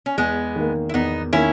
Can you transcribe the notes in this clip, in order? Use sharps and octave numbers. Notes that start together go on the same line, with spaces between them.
C#4
E2 G#3 B3
D#3 A#3
E4
E2 B3 D#4
D#3 A#3 C#4 E4